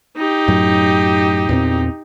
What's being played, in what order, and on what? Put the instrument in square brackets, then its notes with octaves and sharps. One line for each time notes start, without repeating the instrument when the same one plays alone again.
[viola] D#4 G4
[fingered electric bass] F#2 A2 F#3
E2 A#2 C4